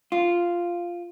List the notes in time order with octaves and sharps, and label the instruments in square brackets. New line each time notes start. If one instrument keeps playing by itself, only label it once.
[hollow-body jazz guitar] F4